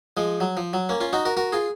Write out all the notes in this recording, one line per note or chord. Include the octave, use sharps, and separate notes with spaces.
F3 G#3
F#3
F3
F#3
A#3 C#4
C#4 F4
D#4 F#4
F#4 A#4
F#4 A#4
F4 G#4